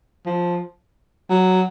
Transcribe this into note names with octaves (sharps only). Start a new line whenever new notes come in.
F3
F#3